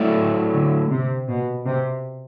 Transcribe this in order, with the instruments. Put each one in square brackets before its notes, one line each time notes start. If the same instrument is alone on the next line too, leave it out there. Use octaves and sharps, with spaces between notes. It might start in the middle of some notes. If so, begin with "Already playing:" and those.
Already playing: [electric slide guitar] F#3 A3 E4 A4 D5
[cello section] D3
C3
B2
C3